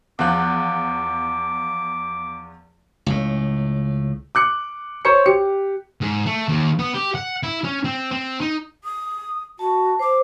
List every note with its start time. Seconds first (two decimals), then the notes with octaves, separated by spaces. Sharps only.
0.19 E2 F3 D6 F#6
3.06 C#2 A2
4.35 D6 F#6 C#7
5.05 C5 C#5 C#6 C#7
5.26 G4 C#7
6.01 G#2
6.26 A3
6.48 D#2
6.79 B3
6.95 G4
7.15 F#5
7.43 E4
7.64 C#4
7.85 C4
8.12 C4
8.41 D#4
8.84 D#6
9.59 F#4 A5
9.99 C5 D6